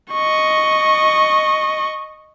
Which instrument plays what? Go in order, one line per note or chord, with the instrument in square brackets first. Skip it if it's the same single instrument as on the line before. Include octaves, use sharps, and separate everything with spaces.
[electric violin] D#5 C#6